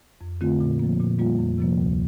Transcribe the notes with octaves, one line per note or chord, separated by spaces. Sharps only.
F2
D3 A3 C4 F4
A#2
F3 A#3
A#2
G3 A#3 F4
F2
C3 F3 A#3
D2